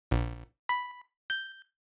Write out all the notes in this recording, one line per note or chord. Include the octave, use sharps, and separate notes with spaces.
A#1
B5
G6